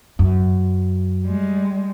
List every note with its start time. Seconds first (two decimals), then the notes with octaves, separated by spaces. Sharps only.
0.19 F#2
1.25 G3 G#3